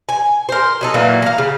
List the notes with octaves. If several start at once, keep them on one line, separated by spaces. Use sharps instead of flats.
G#5
A#4 C5
F#3 D#4 A4
A#2 E3 F#3 A#3
F5 A#5
C#3